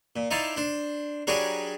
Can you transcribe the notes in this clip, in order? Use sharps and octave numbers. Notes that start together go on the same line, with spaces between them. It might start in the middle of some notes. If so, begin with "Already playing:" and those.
A#2
D#4 E4 C5 D5 F5 A5
D4 C5
F#3 G3 D4 F#4 G#4 A#4